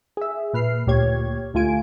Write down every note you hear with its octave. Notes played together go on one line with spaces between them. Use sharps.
G#4 E5
A#2 B4 F6 C7
D2 A#2 G4 C#5 G#6
D2 A3 F4 G#5 D7